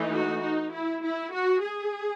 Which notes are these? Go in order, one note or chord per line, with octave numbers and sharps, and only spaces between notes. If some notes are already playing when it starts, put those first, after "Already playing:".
Already playing: E3 A3 D#4
F#4
D#4
E4
E4
F#4
G#4